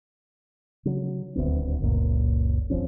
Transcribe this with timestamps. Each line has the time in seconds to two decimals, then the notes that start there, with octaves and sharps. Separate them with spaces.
0.85 C#3 F#3
1.36 D#1 D2 B3 C4
1.80 F#1 C#2 A#2
2.70 D#1 F3 C4 C#4